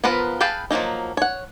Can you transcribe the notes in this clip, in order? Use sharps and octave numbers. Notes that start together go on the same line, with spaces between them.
F3 B3 F4 A#4 B4
G#4 B4 F5 G5 A5
F3 F#3 A3 A#3 D#4
C#5 F#5